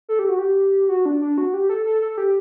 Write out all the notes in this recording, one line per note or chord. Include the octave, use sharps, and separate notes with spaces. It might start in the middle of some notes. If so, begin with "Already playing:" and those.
A4
G4
F#4
G4
F#4
D4
D4
F#4
G4
A4
A4
A4
G4